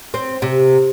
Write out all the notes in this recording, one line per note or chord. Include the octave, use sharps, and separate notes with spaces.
C4
C3